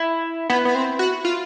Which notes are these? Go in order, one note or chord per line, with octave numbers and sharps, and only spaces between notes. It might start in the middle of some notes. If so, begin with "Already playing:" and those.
Already playing: E4
B3 E4
B3
C4
F#4
F4